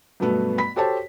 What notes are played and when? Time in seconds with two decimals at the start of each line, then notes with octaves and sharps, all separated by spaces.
0.20 G2 B2 F#3 A3 B3
0.58 B5 B6
0.76 F#4 G4 A4 C5 C#5 A5